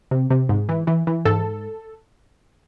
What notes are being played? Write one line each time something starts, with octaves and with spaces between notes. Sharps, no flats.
C3
C3
G#2
E3
E3
E3
G#2 A4